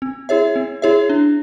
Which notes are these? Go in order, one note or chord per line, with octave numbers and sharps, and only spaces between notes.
C4
E4 G#4 C#5 E5
C4
E4 G#4 C#5 E5
D4